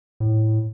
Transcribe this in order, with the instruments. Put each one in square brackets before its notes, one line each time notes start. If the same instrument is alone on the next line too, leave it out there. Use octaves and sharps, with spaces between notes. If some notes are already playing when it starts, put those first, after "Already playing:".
[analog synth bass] A2